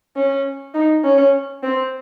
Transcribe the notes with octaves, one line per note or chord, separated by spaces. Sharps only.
C#4
D#4
C#4
C4